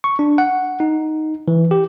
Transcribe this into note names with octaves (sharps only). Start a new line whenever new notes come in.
C#6
D4
F#5
D#4
E3
G4